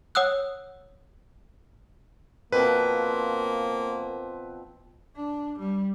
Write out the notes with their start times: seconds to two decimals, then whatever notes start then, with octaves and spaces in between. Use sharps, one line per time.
0.15 C#5 F#5 D#6 E6 F#6
2.52 B2 F3 A#3 C4 B4
5.16 D4
5.59 G3